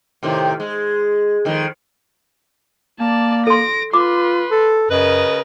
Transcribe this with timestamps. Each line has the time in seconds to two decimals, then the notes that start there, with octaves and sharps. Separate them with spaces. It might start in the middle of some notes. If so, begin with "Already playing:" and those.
0.23 A2 C3 D#3
0.60 G#3
1.45 F2 D#3 G#3
3.00 A#3 D5 A5
3.47 A4 C6 A#6 D7
3.93 F4 B4 C6 D6
4.51 A4
4.91 F#2 C#3 A#4 B4 D#5